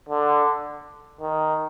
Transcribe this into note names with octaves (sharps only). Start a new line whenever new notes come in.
D3
D#3